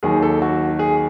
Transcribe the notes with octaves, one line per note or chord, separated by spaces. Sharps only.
D#2 D#3 F#3 G#4
A4
F#4
G#4